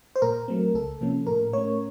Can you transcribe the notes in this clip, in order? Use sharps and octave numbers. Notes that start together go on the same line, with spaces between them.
C5
A#2 A#4
F#3 A3 C4
C#2 A4
C3 F3 A#3 C#4
A2 A#4
A3 C#4 C#5